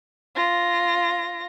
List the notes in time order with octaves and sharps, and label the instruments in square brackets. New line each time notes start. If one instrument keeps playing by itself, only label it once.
[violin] F4 A#6